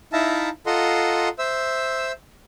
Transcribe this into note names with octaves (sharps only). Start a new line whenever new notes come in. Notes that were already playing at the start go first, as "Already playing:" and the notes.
D#4 E4 E5 F5 A5 A#5
F4 A4 D#5 F#5 A#5 C6
C5 E5 E6